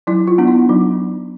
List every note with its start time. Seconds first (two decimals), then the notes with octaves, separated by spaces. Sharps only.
0.07 F#3 E4
0.27 F4
0.38 B3 D4
0.48 E4
0.69 F#3 D#4